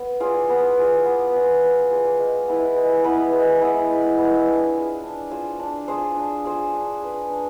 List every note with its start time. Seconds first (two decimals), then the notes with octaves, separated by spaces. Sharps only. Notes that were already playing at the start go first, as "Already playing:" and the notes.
Already playing: B3
0.20 F4 G#4 D5
0.49 B3
0.77 F4 G#4 D5
1.05 B3
1.34 F4 G#4 D5
1.63 B3
1.91 F4 G#4 D5
2.19 G#3
2.48 B3 E4 B4
2.76 G#3
3.04 B3 E4 B4
3.33 G#3
3.61 B3 E4 B4
3.90 G#3
4.18 B3 E4 B4
4.46 D4
4.74 F4 G#4 C5
5.03 D4
5.31 F4 G#4 C5
5.60 D4
5.88 F4 G#4 C5
6.16 D4
6.44 F4 G#4 C5
6.73 D4
7.02 G#4 B4
7.30 D4